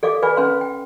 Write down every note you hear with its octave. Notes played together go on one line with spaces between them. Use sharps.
A4 D5 F5 D6
B4 D5 F5 G#5 B5
C#4 B4 F5 C6
G5